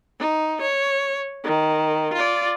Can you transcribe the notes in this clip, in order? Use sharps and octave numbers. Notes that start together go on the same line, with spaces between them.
D#4
C#5
D#3
F4 D5